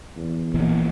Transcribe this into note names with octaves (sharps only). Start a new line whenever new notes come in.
E2
A#1 A#2 E3